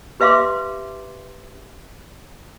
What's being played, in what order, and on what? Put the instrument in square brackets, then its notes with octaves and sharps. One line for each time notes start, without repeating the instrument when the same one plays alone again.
[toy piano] G4 B4 E5 F5 C6 D6